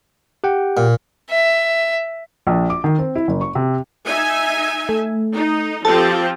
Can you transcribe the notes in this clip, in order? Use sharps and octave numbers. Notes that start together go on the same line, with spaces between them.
G4 F#5 G5
A#2
E5
A#1
D6
D#3
C4
E4
F#1
C#6
C3
D#4 E5 G#5
A3
D#4
F3 C4 G4 A4 A6